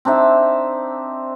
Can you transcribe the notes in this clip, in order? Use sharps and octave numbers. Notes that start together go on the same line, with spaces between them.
C4 D4 D#4 E5